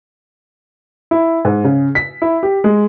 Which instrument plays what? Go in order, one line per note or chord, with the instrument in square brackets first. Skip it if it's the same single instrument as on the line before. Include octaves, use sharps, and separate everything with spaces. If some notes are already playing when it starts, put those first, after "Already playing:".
[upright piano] E4
G#2
C#3
B6
E4
G4
G#3